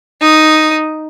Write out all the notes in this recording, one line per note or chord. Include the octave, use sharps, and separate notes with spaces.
D#4 D#6